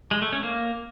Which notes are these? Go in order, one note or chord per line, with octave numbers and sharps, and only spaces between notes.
G#3
A3
C#4
A#3